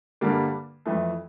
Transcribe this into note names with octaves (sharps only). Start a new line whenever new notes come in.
G2 D3 G3 A#3 D4
F2 E3 A3